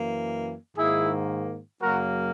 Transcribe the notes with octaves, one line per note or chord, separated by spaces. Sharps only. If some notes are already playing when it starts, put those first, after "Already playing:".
Already playing: F#2 E3 A#3
G#2 D#3 A#3 E4 G#4
F#2 C#3 F#3 A#3 F#4 A#4